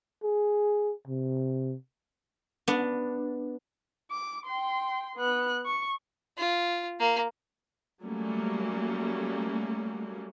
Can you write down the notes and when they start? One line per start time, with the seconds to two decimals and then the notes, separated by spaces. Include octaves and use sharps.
0.23 G#4
1.07 C3
2.68 B3 D4
4.11 D6
4.46 G5 C6
5.16 B3 F#6
5.66 C#6
6.38 F4
7.00 A#3
8.04 F#3 G3 A3 A#3 C#4